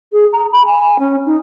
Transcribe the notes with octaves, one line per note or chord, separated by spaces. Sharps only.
G#4
A#5
B5
G#5
C#4
D#4